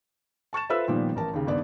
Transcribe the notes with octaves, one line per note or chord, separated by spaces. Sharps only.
A5 C#6 A6 E7
F4 A4 B4 C5 E5 E6
A#2 D#3 F3 G3 B3
A1 A#4 A5
D#2 C#3
G#1 G2 B3 D5